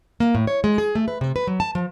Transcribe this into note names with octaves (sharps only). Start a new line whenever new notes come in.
A#3
A2
C#5
G#3
G#4
A3
B4
C3
B4
F#3
A5
F3